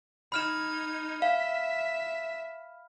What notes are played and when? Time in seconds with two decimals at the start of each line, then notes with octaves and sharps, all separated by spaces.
0.32 D#4 B5 F6 G#6 E7
1.22 E5 F5